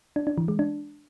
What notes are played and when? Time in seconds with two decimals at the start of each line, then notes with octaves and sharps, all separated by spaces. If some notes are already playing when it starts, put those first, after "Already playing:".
0.16 D4
0.27 D4
0.38 E3
0.48 G#3
0.59 D4